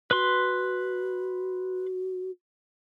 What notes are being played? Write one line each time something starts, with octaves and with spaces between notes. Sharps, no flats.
F#4 B4 C6